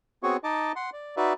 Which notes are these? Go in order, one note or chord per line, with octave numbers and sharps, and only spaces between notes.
B3 C4 F#4 G#4 C#5 C#6
D#4 D#5 A5 D6
F#5 C6
D5
D#4 F#4 B4 D5 E5